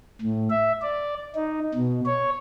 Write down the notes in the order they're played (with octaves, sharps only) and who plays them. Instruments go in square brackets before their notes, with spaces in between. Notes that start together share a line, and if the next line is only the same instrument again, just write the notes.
[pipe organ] A2
E5
D5
D#4
B2
C#5